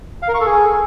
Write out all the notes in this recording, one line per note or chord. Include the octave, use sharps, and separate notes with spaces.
F5
A#4
C#6
A4
G#4